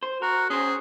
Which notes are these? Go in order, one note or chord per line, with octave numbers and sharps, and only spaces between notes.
C5
F#4 A#4
C#4 G#4 C5